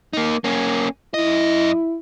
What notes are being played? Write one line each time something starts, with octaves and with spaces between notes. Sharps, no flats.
A#3 D#4
A#3 C#4
F#2 E4 D#5